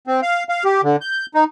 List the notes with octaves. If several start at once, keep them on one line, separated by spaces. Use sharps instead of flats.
C4
F5
F5
G4
D3
G6
D#4